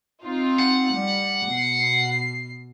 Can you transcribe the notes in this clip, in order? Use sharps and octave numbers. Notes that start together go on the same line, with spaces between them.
C4 D#4 F4
F#5
G3
B2 C7